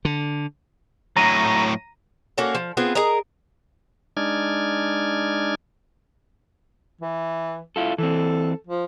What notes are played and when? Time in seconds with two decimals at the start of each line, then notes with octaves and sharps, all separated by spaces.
0.05 D3
1.17 A2 F#3 A#5 A#6 D#7
2.38 A#3 C#4 F#4 A4
2.55 F3
2.77 B3 C4 F4 G#4
2.95 G#4 A#4 D#5 A#5
4.17 G#3 D4 D#4 D5 F6 G#6
7.01 E3
7.76 E4 F4 A4
7.98 E3 C4 A4
8.67 F3